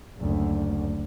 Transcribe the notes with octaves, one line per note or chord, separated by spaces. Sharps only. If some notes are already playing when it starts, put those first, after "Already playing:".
F#1 D2